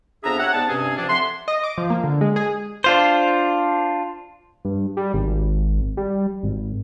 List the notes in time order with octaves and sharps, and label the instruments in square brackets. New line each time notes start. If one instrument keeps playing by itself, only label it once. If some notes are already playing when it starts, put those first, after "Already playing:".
[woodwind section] F2 B3 D4 G#4 E5 A#5
G4 C#5 E5 F#5
G#2 B3 D5 A5
G2 C3 C4 C#4 G#4
F3 C4 D4
A3 E5 F#5 C6
[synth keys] D#5
D6
F3
A#3
D3
G#3
G#4
[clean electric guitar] D4 F4 C5
[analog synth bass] G2
G3
G#1
G3
G#1